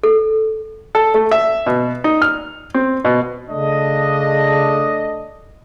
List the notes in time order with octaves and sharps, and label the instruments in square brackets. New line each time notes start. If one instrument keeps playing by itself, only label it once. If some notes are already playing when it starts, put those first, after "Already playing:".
[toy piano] A4
[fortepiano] A4
A3
E5
B2
D#4
F6
C4
B2
[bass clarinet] C#3 [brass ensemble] A3 D4 D#5